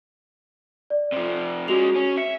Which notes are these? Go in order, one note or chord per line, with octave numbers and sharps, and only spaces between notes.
D5
C3 F3
G#3 C#4 F#4 F7
C#4
E5 C#7